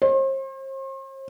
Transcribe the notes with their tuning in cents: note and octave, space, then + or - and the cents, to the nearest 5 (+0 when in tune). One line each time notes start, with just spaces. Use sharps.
C5 +40